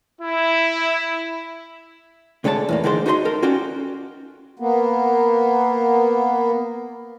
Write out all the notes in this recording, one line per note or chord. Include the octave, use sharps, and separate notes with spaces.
E4
D2 D3 G#3 C#5 A5
E2 A2 A#3
D3 D#3 G#3 D4 A4 C5
D#4 F#4 C5 D#5 A#5 C6
A4 A#4
C#4 F4 F#4 D5 G5
A#3 B3